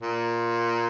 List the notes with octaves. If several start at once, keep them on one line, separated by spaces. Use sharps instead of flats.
A#2